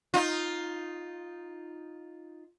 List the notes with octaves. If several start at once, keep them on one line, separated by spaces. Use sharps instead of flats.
D#4 F4